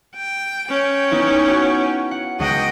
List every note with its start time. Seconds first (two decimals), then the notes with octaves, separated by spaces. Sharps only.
0.16 G5
0.70 C#4 G5
1.11 B3 D#4 E4
1.49 F#4 F#5
2.11 F#5
2.40 C#2 D#5 F#5 G5 D#7